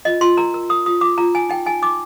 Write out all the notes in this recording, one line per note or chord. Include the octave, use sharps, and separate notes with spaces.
F4 D#5
F4 C6
A#4 A#5
A#4
A#4 D#6
F4 D#6
F4 D6
F4 A#5
D#4 G#5
D#4 G5
D#4 G#5
D#4 D6